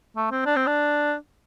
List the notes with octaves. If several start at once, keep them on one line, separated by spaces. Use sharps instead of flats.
A3
C4
D4
C4
D4